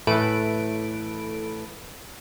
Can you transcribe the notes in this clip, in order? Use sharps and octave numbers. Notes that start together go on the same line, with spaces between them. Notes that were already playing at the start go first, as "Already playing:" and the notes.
A2 E3 A3 A4 B4 D7